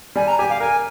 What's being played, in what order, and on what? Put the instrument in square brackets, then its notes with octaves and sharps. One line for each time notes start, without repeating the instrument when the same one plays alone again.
[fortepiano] G3 [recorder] G#5
[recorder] A#5
[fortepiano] G4 [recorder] G#5
[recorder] F5
[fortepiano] A#4 [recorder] G#5